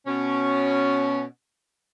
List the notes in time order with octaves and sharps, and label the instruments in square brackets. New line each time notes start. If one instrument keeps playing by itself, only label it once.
[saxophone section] B2 C#4